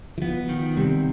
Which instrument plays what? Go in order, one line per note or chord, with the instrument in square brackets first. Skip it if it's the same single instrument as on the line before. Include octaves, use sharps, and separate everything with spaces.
[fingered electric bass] E3
[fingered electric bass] F3 [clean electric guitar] B3
[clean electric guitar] D#3
[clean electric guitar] C3 [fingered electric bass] G3